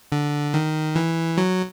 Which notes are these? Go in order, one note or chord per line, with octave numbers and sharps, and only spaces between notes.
D3
D#3
E3
F#3